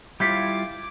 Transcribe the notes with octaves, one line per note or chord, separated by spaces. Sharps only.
G3 E4 F4 D6 G6 B6 C#7